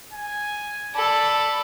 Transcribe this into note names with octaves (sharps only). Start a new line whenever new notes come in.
G#5
A4 D5 B5